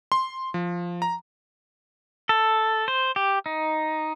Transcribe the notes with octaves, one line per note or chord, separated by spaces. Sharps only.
C6
F3
A#5
A4
C5
G4
D#4